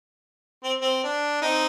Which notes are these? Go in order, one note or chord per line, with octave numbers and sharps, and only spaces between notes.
C4
C4
D4
C4 D#4